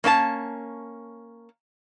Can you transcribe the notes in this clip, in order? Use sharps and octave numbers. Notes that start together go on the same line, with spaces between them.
A#3 C#4 D4 A5